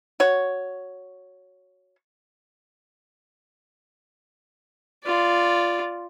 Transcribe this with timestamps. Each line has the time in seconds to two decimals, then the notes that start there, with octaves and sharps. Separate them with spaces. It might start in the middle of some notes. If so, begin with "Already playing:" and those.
0.20 F#4 C#5
5.05 F4 D5